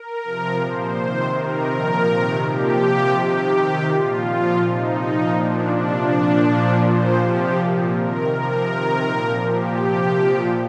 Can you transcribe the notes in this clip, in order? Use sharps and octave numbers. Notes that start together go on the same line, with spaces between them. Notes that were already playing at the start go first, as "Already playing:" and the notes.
Already playing: A#4
C3 F3
A#2 F3 C5
C3 D#3
C3 D#3 A#4
A#2 F3
C3 D#3
A#2 F3 G4
C3 F3
C3 D#3 G4
C3 D#3
A#2 F3 F4
A#2 F3
C3 F3 D#4
A#2 F3
A#2 F3 D4
C3 F3 D4
A#2 F3
A#2 F3
A#2 F3 C5
C3 F3 G4
A#2 F3
C3 D#3 A#4
C3 F3 A#4
C3 D#3
A#2 F3
A#2 F3 G4
C3 F3
A#2 F3